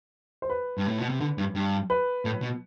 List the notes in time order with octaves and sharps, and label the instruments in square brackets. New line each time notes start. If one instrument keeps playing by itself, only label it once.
[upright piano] C5
B4
[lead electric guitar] G2
A2
B2
C3
D3
G2
G2
[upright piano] B4
[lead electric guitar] A2
B2